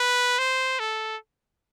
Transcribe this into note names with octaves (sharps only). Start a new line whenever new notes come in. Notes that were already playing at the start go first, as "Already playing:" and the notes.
Already playing: B4
C5
A4